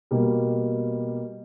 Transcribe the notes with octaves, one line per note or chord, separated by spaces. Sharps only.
B2 G3 A#3